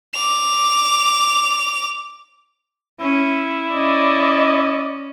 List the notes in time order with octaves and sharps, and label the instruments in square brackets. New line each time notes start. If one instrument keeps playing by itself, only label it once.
[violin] D6 F7
[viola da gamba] C#4 [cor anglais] E4
[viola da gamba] C#4 [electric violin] D5 D#5